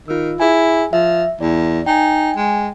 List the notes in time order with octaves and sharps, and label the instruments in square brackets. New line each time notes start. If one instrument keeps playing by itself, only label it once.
[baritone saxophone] D#3 [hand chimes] F4 E6
[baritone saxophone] E4 [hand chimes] G#4 G#5
[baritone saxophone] F3 [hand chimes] E5
[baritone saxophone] E2 [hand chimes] D5
[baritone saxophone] D#4 [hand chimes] G5 G#5
[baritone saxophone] G#3